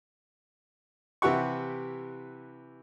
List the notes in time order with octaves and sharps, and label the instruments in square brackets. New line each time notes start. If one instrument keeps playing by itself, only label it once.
[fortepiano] C3 E3 E4 G4 F#5 C#6